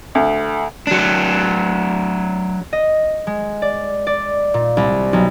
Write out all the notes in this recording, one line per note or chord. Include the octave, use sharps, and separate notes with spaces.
D2
F#3 D4
D#5
G#3
D5
D5
A#2
C2
B1